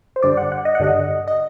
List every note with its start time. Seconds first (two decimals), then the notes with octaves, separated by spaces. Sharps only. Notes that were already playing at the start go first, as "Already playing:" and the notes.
0.16 C5
0.22 G2 D3 G3 D4 D5
0.37 F#5
0.52 F#5
0.65 D#5
0.75 F#5
0.79 G2 D3 G3 D4 D#5
1.28 D#5